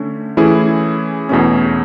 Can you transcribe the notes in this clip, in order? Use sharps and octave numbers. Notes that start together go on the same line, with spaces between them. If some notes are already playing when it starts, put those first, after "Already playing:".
Already playing: D3 A3 C#4
E3 A3 C#4 E4 G#4
E2 B2 A3 C#4